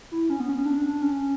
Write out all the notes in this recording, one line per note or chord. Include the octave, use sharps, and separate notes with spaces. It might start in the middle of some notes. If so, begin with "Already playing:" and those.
E4
C#4
B3
C#4
D4
C#4